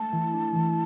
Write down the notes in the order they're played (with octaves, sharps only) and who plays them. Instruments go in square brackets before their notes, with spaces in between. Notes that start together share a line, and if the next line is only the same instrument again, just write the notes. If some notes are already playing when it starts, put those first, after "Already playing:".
Already playing: [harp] A3 D4 [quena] A5
[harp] E3
D4
E3